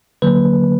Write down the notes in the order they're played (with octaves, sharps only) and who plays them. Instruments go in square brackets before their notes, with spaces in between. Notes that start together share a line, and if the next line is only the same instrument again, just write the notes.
[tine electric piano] D3 F#3 A#3 B4